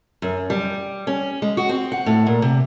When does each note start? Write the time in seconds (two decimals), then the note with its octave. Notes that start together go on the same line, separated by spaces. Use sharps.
0.22 F#2
0.50 G3
1.07 C#4
1.42 G#3
1.57 F#4
1.69 C4
1.92 F#5
2.06 A2
2.27 A#2
2.42 C3